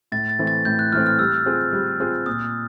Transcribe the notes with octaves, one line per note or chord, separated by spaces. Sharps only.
A2 A6
A6
E3 A3 C4
A6
A2 G6
F#6
E3 A3 C4 F6
F6
G3 E6
C4 F4 G#4
G3
C4 F4 G#4
A#2 D#6